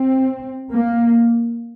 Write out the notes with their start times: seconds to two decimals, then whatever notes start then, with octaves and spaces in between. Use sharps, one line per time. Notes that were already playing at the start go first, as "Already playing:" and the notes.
Already playing: C4
0.72 A#3